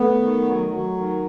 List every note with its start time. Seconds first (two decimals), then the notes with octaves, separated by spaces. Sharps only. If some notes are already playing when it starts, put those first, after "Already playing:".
Already playing: A3 B3
0.20 D#3
0.46 F#3
0.71 F#3
0.97 D#3